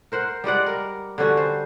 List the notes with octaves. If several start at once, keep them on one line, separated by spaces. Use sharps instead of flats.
A#4 C5 F#5
G3 G#3 D5 F#5
A#4
D3 G3 C#4 F#4
C5